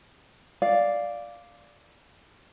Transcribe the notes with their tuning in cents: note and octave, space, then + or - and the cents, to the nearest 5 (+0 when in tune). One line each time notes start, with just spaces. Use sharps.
D5 +0 F5 +0